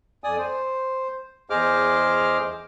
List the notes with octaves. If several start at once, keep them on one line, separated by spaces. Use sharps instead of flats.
F2 D5 G#5 D#6
C5
E2 G#4 C5 D#5 D6 F6